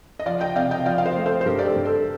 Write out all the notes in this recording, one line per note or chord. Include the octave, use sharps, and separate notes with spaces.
D#5
F3 D5 F5
D#5 G5
C3 D5 F5
D#5 G5
F3 D5 F5
F5
C5 D#5
A3
A4 C5
C5
G2 G4 A#4
D5
A4 C5
G2
A4 C5